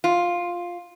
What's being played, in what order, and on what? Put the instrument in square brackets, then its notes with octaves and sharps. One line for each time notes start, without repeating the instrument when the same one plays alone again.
[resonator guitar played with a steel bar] F4